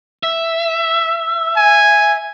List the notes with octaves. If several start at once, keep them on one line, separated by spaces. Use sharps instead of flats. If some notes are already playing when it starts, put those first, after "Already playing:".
E5
G#5